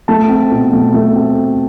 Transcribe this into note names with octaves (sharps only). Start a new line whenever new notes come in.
A3 A5
C4
B2
A3
A3
C4